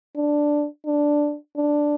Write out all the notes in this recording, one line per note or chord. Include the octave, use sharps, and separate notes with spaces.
D4
D4
D4